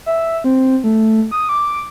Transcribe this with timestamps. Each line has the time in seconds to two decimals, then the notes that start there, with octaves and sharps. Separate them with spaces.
0.06 E5
0.44 C4
0.84 A3
1.31 D#6
1.49 D6